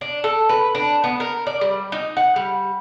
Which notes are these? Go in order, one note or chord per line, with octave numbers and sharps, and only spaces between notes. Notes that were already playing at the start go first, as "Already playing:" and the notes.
D4
A4
B4
D4
B3
A#4
D5
G3
D#4
F#5
G3